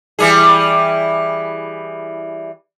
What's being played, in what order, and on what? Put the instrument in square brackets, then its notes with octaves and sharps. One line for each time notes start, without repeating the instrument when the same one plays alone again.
[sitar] E3 G3 G#4